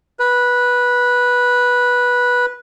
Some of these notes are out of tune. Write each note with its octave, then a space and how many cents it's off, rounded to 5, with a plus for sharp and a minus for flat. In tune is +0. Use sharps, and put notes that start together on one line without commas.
B4 -10